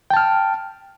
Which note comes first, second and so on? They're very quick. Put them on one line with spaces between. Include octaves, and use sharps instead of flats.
G5 A5 F6